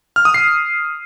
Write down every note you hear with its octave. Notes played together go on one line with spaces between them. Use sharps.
F6
D#6
C7